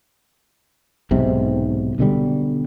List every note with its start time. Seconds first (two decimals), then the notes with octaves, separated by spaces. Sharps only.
1.11 B1 G#2 C3
1.99 B2 D3 G3